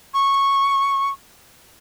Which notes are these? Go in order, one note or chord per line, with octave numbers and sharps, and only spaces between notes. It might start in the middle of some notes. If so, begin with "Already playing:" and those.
C#6